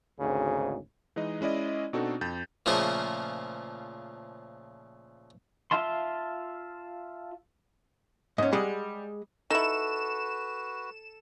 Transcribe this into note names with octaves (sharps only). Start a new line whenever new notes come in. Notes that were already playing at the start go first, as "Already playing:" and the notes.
G#1 D2 G#2 C#3
E3 G#3 D#4 D#5
G#3 C#4 E4 D5 D#5
B2 C4 D4 D#4 F#4 A4
F2 G6 A6
A#2 C#3 F3 A3 G#4 A#4
F4 E5 F5 A5 C6
G#2 C#4 D#5
G3 G#3 G#4 F#5
D#4 E4 F#4 A4 B4 E7